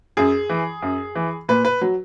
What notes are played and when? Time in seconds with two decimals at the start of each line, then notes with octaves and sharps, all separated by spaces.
0.17 F#2 G#4
0.49 E3
0.82 F#2
1.15 E3
1.49 A#2 B4
1.65 B4
1.81 F#3